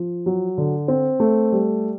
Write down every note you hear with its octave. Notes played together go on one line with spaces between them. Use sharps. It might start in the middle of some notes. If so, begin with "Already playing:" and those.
Already playing: F3
F#3
D3
C4
A3
G3